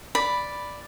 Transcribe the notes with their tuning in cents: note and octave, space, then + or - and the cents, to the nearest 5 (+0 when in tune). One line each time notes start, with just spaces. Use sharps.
D5 +0 B5 +0